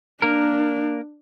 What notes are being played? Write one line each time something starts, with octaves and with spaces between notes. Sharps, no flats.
A#3 D4 A#4